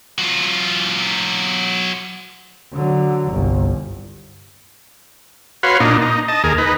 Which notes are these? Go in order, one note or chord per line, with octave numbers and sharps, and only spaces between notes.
F#3 F4
D3 F#3
G1 C2
F#4 B4 C#5 F5 C6
A#2 D4 D#4
D#4
D#5 A5
D#2 G#4 A#4
D#4 B4